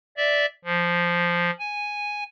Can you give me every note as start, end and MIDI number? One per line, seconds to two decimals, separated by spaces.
0.17 0.46 74
0.17 0.46 76
0.65 1.51 53
1.59 2.23 80